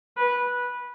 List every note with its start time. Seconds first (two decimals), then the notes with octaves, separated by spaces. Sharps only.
0.17 B4